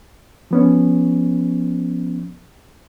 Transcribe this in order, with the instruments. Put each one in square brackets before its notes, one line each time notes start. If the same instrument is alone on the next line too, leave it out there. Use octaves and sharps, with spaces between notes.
[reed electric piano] F3 B3 C#4